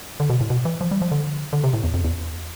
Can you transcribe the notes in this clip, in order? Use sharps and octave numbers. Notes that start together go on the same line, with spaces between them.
D3
B2
A2
B2
E3
F3
G3
F3
D3
D3
C3
A2
E2
F2
E2